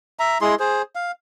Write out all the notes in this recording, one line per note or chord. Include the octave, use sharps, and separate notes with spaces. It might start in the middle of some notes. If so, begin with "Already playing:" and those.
E5 A#5
G#3 E4 G#4 C6
G#4 C5
F5